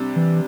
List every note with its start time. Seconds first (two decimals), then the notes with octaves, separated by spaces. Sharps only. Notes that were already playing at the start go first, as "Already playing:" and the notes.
Already playing: C3 G3 D4
0.16 E3